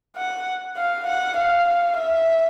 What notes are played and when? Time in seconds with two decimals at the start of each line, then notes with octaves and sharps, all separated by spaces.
0.16 F#5
0.77 F5
1.07 F#5
1.37 F5
1.98 E5